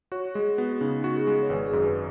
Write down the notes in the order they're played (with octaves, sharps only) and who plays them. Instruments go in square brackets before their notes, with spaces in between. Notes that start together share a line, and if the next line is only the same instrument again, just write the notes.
[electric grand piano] F#4 [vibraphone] C#5
[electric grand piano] G#3 [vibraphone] G#4
[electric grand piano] B3 [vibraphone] F#4
[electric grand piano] C#3 [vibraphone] D#4
[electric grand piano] F#4
[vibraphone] G#4
[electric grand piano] G#3
[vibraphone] C#5
[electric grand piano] G#1 [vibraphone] B4
[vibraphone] G#4
[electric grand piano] F#2
[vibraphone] B4